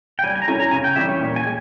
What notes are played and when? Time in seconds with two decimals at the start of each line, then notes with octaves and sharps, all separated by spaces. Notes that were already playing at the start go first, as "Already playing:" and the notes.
0.19 G5
0.23 G3 G#5
0.36 G#5
0.42 A#5
0.48 C#4 E4 G#5
0.60 A#5
0.71 C#3 G#5
0.84 G5
0.96 E3 G3 C#4 G4 E5
1.09 C#5
1.20 A#2
1.36 G#5
1.44 G#3 G4